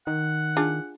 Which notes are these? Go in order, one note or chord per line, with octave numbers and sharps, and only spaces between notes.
D#3 F#5
D4 F4 G#4